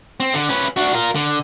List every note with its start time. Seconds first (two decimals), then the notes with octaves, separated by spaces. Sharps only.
0.20 C4
0.34 D3
0.49 C#4 B4
0.76 D4 F#4
0.94 F4 A#4
1.15 D3